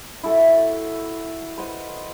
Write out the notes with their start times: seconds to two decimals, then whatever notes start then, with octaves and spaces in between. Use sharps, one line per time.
0.23 E4 F#4 A4 E5
1.58 B4 C5 D#5 F#5